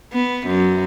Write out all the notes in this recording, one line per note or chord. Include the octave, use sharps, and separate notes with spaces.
B3
F#2